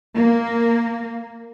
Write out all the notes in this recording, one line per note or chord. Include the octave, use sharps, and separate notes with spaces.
A#3